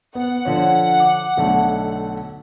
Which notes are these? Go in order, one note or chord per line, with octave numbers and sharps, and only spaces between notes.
B3 F#5
D3 F3 C#5
D6
B1 D3 A3